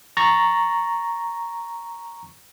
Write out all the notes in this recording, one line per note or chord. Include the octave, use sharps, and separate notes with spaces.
A#5 C#6 A6 A#6